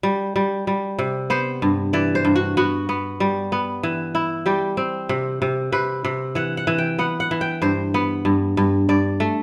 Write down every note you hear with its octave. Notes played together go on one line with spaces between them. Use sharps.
G3
G3
G3
C3
B3 C5
G2
E3 D5
C5
G2
F#4
B3 F#4
B3
G3
B3
E3
E4
G3 G4
C4
C3
C3
C3 B4
C3
E3 F#5
F#5
E3
G5
B3 F#5
F#5
E3
G5
G2 C5
B3
G2
G2
G2 D5
A3